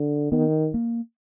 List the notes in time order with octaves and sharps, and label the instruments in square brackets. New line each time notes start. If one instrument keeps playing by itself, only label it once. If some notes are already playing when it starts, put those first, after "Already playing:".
Already playing: [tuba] D3
[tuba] D#3 [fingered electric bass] B3
[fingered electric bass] A#3